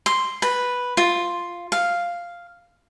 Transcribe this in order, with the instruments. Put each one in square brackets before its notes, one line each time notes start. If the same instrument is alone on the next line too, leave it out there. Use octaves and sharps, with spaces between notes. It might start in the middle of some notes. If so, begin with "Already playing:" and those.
[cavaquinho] C6
B4
F4
F5